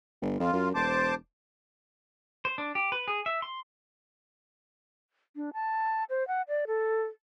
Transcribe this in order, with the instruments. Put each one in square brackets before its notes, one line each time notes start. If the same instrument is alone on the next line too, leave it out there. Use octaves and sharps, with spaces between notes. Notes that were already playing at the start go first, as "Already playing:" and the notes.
[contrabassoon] G1
[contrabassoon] F2 [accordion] F4
[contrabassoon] F#2
[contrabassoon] E1 [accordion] C5 A5 D6
[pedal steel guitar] C5
D4
G4
B4
G#4
E5
C6
[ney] D4
A5
C5
F#5
D5
A4